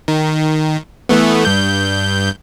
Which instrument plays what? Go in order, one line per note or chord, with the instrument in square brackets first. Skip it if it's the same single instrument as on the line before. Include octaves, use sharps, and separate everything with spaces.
[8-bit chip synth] D#3
E3 A3 B3
G2 G6